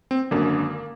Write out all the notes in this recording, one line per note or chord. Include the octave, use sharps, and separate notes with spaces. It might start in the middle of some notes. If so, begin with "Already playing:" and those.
C4
G#1 F#2 D3 A#3